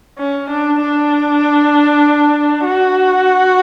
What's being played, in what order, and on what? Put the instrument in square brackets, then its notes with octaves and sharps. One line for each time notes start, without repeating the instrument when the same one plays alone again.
[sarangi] C#4
D4
D4
F#4